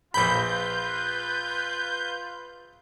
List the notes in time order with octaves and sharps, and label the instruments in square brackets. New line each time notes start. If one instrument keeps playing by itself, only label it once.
[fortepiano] A#1 B5 [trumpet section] F4 B4 [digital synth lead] G6